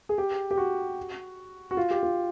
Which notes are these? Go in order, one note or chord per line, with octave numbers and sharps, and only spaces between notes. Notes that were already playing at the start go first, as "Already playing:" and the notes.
G#4
G4
G4
F#4
F#4
F4
G4
F4